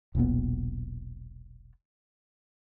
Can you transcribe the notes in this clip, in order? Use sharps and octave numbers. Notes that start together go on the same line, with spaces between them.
E1 B1 A#2 B3